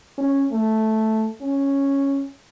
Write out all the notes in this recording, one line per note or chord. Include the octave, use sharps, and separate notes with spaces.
C#4
A3
C#4